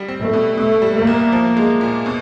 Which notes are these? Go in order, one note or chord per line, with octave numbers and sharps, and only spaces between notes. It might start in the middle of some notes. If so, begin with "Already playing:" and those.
Already playing: G3
C4
A3
B2
B2 A3
G3
A#3
C2
F3
G#3
A#2
B2